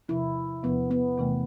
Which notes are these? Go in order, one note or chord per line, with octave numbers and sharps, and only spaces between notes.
E2 C3 F3 E4
E2 C3 F3 B3
B3
E2 C3 E3 A3